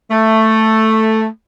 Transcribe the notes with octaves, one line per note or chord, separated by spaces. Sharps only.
A3